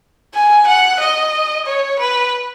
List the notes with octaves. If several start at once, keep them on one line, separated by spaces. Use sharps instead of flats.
G#5
F#5
D#5
C#5
B4